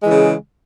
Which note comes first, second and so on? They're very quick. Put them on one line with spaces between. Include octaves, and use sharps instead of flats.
G#3 E3 C#3